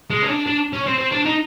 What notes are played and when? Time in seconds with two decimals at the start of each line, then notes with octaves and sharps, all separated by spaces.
0.10 G#3
0.22 C#4
0.29 D4
0.47 D4
0.73 C#4
0.86 C4
0.99 C4
1.12 D4
1.26 D#4